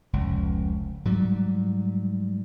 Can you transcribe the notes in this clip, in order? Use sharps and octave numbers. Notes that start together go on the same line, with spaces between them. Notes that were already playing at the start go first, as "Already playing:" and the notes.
F1 C#2
G#2 F#3 G3